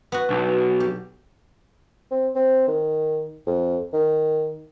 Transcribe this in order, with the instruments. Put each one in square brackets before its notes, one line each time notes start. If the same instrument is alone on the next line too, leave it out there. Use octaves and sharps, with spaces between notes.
[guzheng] B3 F#4
[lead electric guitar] B1
[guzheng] G4
[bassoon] C4
C4
D#3
F2
D#3